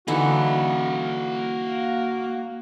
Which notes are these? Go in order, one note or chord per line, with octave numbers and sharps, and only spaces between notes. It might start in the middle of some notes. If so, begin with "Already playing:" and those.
D3 E3 A#3 D#4 F#4 F#5